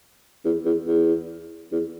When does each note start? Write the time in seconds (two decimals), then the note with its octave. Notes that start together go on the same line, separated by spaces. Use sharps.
0.45 E2
0.65 E2
0.87 E2
1.72 E2